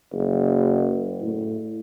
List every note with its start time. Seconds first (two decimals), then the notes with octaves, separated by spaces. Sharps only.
0.13 F#1
1.21 A2